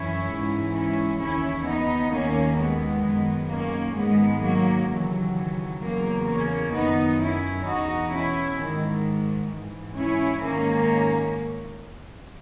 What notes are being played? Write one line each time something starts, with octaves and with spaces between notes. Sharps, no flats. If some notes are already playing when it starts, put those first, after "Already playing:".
Already playing: F#2 E3 C#4 E4
G#2 E3
C#4 E4
D#2 C#3 E3 C#4 E4
B3 D#4
D#2 D#3 A#3 C#4
G#3 B3
F#2 D#3
A#3 C#4
G#2 D#3 G#3 B3
F#3 A#3
D#2 C#3 E3 F#3
F#3
E2 C#3 E3 F#3 A#3
A#3 C#4
F#2 D#3 B3 D#4
C#4 E4
E2 B2 D#4 F#4
C#4 E4
G#2 D#3
G#2 E3
C#4 E4
G#2 D#3 A#3 C#4